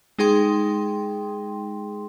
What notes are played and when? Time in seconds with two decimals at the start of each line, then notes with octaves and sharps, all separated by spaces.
0.19 G#3 D#4 G#4 G5 C6